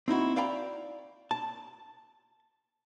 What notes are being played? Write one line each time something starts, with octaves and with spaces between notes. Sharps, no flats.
C4 D#4 E4 F#4
D5 F5 G5 A#5 B5
A5